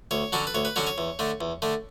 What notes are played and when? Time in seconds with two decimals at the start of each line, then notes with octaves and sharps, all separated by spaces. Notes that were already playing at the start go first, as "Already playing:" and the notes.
0.11 D2 C#5
0.33 D3 F#3 C#4 A4
0.47 B4
0.55 D2 C#5
0.65 B4
0.76 D3 F#3 C#4 C#5
0.87 C#5
0.98 E2
1.19 D3 A3
1.41 E2
1.62 D3 A3